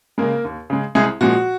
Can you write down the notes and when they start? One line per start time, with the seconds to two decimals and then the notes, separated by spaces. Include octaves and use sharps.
0.18 C#3 G#3 A#3 A#4
0.45 D#2
0.70 C#3 G#3
0.95 C2 G#3 G#4
1.21 A#2 F3 G#3 F#4